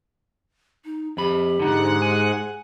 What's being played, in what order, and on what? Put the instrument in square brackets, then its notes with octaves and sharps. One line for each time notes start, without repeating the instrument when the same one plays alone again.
[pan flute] D#4
[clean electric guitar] F2 B5 [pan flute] G4
[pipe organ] G#2 G#3 F#5 [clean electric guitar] D3 D#4
[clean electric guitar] G#5